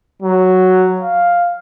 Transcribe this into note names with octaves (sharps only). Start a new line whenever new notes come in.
F#3
F5